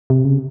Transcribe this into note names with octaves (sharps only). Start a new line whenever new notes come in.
C3
C#3